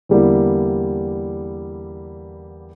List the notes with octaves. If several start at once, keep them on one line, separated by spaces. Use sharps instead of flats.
E2 D3 G3 A#3 E4